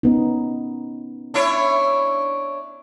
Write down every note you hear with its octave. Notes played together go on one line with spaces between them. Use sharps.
B3 C#4 D#4
D4 E4 C#5